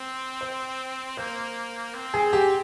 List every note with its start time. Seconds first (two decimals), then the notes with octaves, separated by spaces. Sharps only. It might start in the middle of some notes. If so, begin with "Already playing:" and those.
Already playing: C4
0.41 C5
1.17 A#3 C5
1.95 C4
2.14 G#4
2.33 G4